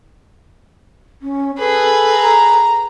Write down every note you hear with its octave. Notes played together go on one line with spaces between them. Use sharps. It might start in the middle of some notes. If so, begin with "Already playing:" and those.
C#4
G#4 A4 B4
A#5